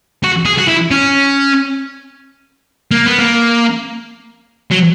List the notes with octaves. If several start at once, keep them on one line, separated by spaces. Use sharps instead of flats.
F#4
G#4
F#4
E4
C#4
A#3
B3
A#3
F#3